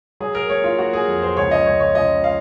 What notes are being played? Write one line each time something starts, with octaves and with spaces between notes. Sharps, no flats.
F#3 G#4
A#4
A#3 C#5
F4
A#3 F#4
G#4
F2
C5
C#2 C#5
D#5
C#2 C#5
C#5
C#2 D#5
F5